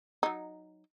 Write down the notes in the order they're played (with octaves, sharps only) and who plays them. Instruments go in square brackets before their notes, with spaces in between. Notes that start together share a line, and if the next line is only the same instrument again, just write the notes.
[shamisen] F#3 D#4